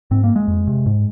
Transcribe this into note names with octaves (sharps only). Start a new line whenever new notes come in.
G#2 C4
A#3
G#3
F2
C3
G#2